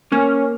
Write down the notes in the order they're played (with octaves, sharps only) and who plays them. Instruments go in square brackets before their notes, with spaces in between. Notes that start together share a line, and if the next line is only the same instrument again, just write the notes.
[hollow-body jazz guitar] A#3 [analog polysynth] C#4